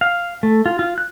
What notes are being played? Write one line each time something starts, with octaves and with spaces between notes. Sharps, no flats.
F5
A3
F4
F4
F#6